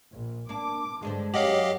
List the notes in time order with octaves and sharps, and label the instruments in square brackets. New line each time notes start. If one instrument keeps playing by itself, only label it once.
[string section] A#1
[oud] A#3 D4 [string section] D6
[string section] G2 D3 [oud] G#3 D4 C5
[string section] F#2 F#3 [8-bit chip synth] G4 D#5 F5 [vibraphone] C#5 F#5